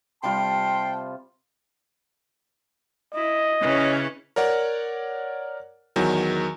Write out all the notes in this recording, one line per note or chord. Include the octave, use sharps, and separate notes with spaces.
C3 G3 F4 G5 A5 C6
E4 D#5
C#3 E3 C#4
A#4 C#5 D5 F#5
E2 D#3 F#3